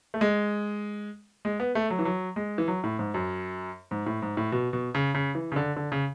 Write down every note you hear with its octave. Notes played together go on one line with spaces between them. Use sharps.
A3
G#3
G#3
B3
A3
F#3
E3
F#3
G#3
E3
F#3
A2
G#2
F#2
G#2
A2
G#2
A2
B2
B2
C#3
C#3
E3
C#3
D3
D3
C#3